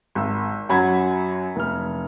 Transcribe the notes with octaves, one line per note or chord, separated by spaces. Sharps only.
G#1 E6
F#2 F#3 B5 G#6
F1 F6